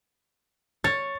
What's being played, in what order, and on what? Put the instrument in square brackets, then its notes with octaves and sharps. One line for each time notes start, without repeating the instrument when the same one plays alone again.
[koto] C#5 [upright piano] A6